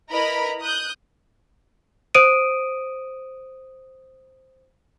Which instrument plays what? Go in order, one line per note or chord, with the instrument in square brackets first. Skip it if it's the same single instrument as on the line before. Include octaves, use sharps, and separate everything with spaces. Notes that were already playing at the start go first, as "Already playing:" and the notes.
[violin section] E4 A#4 B4 D#5 A#5 B5
D#6 F#6 G6
[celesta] C5 D#6 D7 D#7